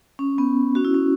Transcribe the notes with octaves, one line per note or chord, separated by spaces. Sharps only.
C#4
B3
C#4 F#4
E4
C#4